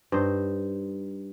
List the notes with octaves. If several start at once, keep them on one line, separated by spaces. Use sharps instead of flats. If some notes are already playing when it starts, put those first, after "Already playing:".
G2 D#4 C5